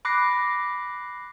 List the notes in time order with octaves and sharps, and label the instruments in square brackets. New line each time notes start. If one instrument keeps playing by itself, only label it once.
[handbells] B5 D6 F#6 A#6 C7